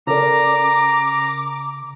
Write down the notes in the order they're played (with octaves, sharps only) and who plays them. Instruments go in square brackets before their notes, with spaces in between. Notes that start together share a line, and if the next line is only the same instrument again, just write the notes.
[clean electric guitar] C#3 [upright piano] A4 A#4 D5 [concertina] A#5 [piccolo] D6